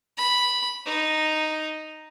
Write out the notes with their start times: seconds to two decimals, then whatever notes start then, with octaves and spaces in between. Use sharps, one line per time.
0.18 B5
0.86 D#4